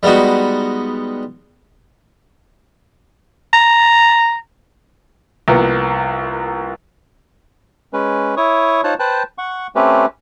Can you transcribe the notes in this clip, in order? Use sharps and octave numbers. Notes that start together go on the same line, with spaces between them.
G3 G#3 B3 D#4 F#4
A#5
C2 F3 A#3 B3
G#3 C#4 B4
E4 C#5 C#6 D#6
D#4 F4 C5 C#5 A5 F#6
B4 C5 G5 A5 F#6
F#5 C#6
A3 C4 C#4 G4 B4